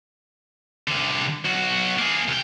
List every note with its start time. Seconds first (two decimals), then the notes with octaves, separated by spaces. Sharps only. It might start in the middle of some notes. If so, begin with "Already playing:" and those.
0.88 C2 D3
1.45 B1 F#4
1.99 A#3 G#4
2.28 C2 G5